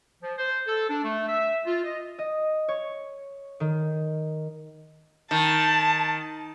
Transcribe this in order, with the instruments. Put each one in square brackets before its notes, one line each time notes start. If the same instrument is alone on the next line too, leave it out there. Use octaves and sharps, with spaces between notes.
[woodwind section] F3
C5
A4
D4
A3
E5
F4
D#5
[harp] D#5
C#5
D#3
[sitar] D#3 [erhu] A5